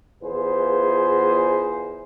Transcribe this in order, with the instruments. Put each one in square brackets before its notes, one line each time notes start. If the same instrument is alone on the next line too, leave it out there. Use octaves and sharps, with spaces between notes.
[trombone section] E2 F4 G#4 B4 C5